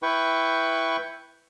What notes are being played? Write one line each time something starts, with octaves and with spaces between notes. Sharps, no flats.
E4 B4 G5 C#6